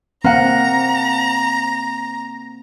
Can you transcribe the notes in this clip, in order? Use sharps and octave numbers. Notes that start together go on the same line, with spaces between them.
A#3 C4 F#5 A#5